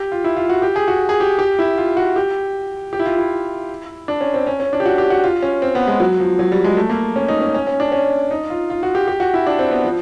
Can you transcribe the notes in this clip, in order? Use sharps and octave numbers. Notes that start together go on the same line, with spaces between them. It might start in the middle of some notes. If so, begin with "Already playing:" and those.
Already playing: G4
F4
E4
F4
F#4
G4
G#4
F#4
G#4
G4
G4
E4
F4
F#4
G4
G4
E4
F4
E4
D4
C#4
C4
C#4
C#4
D4
G4
F#4
G4
F#4
F4
C#4
C4
B3
G#3
F#3
F3
F#3
G3
G#3
A3
A#3
C#4
D#4
C#4
C#4
C#4
D4
C#4
D#4
F4
F4
F#4
G4
G4
F#4
E4
D4
C4
B3
F3